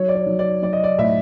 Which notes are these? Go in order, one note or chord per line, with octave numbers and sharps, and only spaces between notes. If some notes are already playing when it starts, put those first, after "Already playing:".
Already playing: F#3 C#5
D5
C#5
F#3
D5
F#3 D5
D#5
D5
A2 E5